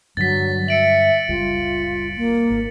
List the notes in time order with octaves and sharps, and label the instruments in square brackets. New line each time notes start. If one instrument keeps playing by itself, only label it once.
[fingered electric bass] G2 D3 [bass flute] F#3 [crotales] A6 B6
[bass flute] E5 [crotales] C#7 D7 F#7
[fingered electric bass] F#1 C#2 G3 [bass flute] F4
[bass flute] A#3
[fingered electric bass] G#1